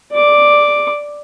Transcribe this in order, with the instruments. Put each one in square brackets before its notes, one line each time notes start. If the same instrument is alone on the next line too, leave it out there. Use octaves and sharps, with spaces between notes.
[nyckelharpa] D5 D6